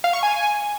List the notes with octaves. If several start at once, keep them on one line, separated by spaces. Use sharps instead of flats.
F5
C#6
G#5